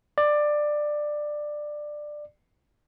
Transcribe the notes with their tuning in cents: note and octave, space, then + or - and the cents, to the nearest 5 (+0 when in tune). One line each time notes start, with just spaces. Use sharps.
D5 +15